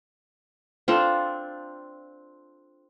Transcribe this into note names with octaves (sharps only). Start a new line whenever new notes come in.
C4 D4 F4 A4